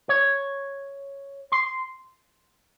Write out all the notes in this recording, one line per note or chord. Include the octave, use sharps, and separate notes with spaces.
C#5
C6